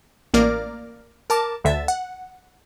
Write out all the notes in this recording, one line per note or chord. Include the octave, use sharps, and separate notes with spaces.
A1 A#3 A#4 D5 D6 F6
A#4 A5 D6
D2 D3 E5 A6
F#5